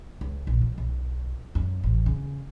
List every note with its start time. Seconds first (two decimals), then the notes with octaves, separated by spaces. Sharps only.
0.21 C#2
0.47 A#1
0.61 F3
0.78 B1
1.55 F#2
1.84 A1
2.06 C#3